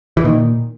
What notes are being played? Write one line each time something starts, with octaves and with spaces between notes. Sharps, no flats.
E3
A#2 D#3